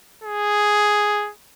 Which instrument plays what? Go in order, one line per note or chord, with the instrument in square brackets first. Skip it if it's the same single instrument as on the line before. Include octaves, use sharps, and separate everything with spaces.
[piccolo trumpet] G#4